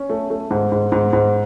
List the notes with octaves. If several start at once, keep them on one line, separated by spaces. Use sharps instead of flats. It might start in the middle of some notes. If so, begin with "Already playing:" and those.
Already playing: C#4
A3
A3
G#2
G#2
G#2
G#2